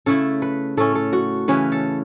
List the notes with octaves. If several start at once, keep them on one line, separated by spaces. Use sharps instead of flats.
C#3 A3 E4 A4
B4
A2 A3 C#4 A4
A4
F#4
C#3 E3 C#4 B4
A4